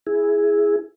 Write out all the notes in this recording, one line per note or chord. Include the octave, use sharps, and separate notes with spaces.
E4 G#4